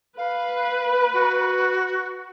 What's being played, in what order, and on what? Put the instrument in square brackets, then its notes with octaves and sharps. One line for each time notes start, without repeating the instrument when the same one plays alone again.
[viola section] B4 [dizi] F5
[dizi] F#4